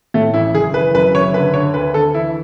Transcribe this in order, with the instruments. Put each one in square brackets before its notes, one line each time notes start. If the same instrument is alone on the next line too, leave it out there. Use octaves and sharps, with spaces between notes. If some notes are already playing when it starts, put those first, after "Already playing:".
[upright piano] A2 A3
A1 E4
F#1 G#4
E3 B4
F#2 B4
F#1 C#5
D3 B4
D3 C#5
D2 B4
D2 A4
E3 E4